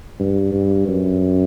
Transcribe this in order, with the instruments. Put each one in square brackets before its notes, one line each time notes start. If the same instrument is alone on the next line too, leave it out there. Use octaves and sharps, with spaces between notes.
[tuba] G2
G2
F#2